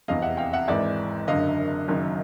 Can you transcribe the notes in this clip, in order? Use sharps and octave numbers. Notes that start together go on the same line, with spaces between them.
F1 E2 C3 D#5 F5
E5 F#5
F5 G5
E5 F#5
G#1 G#2 E3 D5 E5
F#1 F#2 D3 D#5 F5
F#1 F#2 D#3